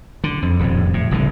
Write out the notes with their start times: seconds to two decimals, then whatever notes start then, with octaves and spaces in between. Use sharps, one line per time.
0.24 D3
0.42 F2
0.59 D#1 F2 A2
0.94 A2
1.11 F#1 C2 A2 D3